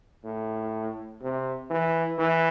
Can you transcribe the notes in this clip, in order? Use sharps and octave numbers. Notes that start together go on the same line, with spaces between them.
A2
C3
E3
E3